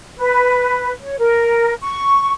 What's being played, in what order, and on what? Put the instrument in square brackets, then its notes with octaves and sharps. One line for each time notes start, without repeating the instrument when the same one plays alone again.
[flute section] B4
C#5
A#4
C#6